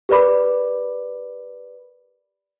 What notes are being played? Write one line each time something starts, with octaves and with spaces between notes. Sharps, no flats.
G4 A#4 B4 D5 B5 D6